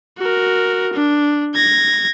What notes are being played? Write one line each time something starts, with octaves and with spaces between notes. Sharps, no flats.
F#4 A#4
D4
G#6 A#6